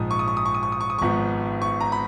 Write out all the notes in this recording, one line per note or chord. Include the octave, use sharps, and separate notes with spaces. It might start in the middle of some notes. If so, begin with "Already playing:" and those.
Already playing: A#1 G#2 F3 D#6
C#6
D#6
C#6
D#6
C#6
D#6
C#6
D#6
C#6
D#6
G#1 G#2 F3 B3 C#6
C#6
A#5
B5